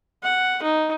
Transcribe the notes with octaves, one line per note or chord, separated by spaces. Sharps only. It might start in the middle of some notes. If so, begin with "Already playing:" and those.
F#5
D#4